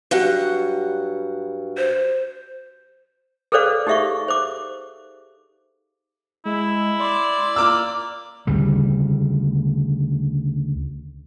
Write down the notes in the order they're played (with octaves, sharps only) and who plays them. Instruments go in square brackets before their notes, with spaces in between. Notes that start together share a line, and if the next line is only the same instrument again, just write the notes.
[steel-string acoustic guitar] G2 F#3 F#5
[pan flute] C5
[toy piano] G#4 A4 B4 C5 D5 F5
D#4 G4 G#4 E5 F5 C#6
C5 D6
[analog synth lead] G#3 [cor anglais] E4
[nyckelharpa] D5 [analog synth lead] C6
[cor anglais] A#3 [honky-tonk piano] D6 E6
[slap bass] D2 C#3 G3